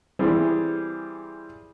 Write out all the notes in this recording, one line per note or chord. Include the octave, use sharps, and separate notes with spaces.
E3 G3 C4 G4 G#4